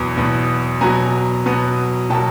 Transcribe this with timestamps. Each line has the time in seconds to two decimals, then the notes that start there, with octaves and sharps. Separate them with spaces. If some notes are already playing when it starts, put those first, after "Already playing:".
Already playing: E2 B2 F#3 B3
0.17 E2 B2 F#3 B3
0.81 B2 F#3 B3 G#5 A#5
1.46 B2 F#3 B3
2.10 B2 F#3 A#3 G5 A5